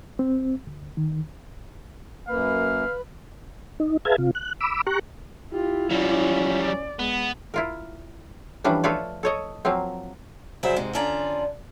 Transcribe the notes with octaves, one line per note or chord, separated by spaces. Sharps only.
C4
D2
D#3
F#2 A#3 B4 F5
D#4
G#4 B4 E5 F5 A5 G#6
C3 F4
F#6
B5 D6 E6
G4 A#5 C#6 F#6
E4 F4 G4
F#3 G3 C#4
D5
G#3 B3
E4 F4 A#4
E3 F3 G3 C#4 D4
A3 F4 A4 B4 C#5 D5
A4 C#5 D#5
F3 F#3 A#3 C4
C#3 F#3 G3 G#4 C5 E5
G#2 C3 G#3
D3 C#4 D4 F4 D5 A#5